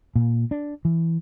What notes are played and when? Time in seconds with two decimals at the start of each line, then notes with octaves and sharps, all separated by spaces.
0.16 A#2
0.51 D4
0.85 E3